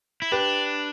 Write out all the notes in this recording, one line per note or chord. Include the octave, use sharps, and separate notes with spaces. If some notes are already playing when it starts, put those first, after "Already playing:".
E4
D4 G4 B4